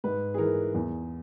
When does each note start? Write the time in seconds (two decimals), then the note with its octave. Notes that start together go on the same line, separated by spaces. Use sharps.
0.04 G#2 B4
0.34 G#4
0.38 E3 A#4
0.74 E2